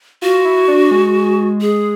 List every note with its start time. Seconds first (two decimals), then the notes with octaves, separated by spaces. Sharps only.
0.22 F4 F#4
0.45 E4
0.68 D4
0.91 G#3
1.61 G#4